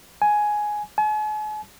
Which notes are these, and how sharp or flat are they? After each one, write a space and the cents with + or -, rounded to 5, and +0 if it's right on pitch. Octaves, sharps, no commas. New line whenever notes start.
G#5 +10
G#5 +45